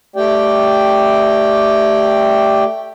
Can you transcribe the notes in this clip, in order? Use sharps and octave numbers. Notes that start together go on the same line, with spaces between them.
A3 G4 D5 G5